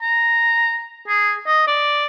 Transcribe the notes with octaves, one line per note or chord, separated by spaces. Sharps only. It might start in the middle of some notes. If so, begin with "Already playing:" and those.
A#5
G#4
D#5
D5